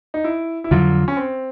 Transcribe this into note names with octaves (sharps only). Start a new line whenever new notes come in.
D#4
E4
E4
F2 D3 F#3 F4
C#4
C4